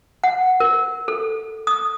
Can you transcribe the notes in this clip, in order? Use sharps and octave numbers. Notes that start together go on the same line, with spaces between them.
F#5
A#4
A4
D#6